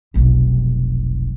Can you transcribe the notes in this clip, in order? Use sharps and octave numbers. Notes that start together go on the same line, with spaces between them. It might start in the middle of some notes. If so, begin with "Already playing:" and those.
F1 B1